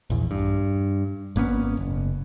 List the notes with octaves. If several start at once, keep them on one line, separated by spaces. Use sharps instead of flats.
A#1 E2
G2
G#1 A#3 B3 C#4
F#1